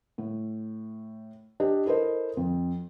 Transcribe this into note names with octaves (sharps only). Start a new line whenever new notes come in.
A2
D4 G4 D5 D#5
E4 A4 A#4 C5 D#5
F2